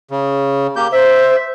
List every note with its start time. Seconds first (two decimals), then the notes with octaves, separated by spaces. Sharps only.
0.11 C#3
0.76 A#3 G4 G6
0.92 C5 E5